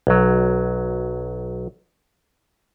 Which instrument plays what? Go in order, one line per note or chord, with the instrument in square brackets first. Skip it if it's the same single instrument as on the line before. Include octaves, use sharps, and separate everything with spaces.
[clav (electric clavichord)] B1 F#3